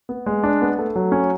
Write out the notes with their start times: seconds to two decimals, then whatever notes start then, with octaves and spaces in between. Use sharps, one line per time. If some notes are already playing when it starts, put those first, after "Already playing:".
0.09 B3
0.26 G#3
0.44 D4
0.61 B3
0.79 A3
0.96 F#3
1.12 C#4